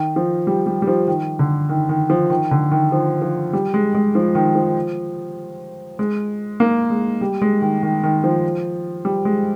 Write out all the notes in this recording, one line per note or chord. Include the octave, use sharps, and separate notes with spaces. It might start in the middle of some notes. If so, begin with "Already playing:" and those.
Already playing: D#3
F3
G3
G3
G3
F3
D#3
D3
D#3
D#3
F3
D#3
D3
D#3
F3
F3
G3
G#3
G#3
F3
D#3
F3
G#3
A#3
G#3
G3
G#3
D#3
D#3
D#3
F3
G3
G#3